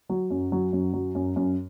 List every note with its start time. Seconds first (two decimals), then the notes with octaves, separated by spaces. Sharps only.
0.09 F#3
0.30 F#2
0.52 F#3
0.73 F#2
0.93 F#3
1.15 F#2
1.36 F#2